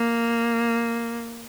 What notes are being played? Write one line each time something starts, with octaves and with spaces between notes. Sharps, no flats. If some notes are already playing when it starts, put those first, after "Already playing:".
Already playing: A#3